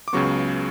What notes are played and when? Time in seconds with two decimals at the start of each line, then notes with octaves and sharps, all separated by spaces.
0.08 D6
0.13 C#2 C#3 F#3 B3 C#6